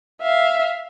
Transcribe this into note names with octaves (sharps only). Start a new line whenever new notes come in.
E5 F5